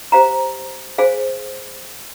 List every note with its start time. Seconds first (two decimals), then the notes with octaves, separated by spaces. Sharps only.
0.12 G4 C5 F5 A#5
0.98 G#4 C5 F5 G#5